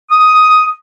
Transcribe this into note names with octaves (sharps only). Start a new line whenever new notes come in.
D#6